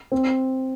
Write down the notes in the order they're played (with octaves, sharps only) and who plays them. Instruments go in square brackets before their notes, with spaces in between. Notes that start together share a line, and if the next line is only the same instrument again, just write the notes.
[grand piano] C4